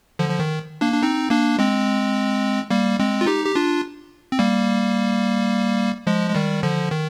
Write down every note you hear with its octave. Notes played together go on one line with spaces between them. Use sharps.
D3 F3
F3
D#3
A#3 D4
D4
C4 D#4
A#3 D4
G#3 C4
G3 A#3
G#3 C4
F4
D#4 G4
G4
D4 F4
C4
G3 A#3
F3 G#3
G#3
D#3 G3
D3 F3
D#3